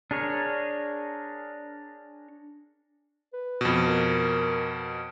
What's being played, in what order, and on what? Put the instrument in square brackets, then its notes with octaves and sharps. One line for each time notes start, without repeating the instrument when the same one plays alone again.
[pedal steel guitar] D4 G#4 A#4 C#5
[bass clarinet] B4
[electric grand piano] F2 B2
[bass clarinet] A#4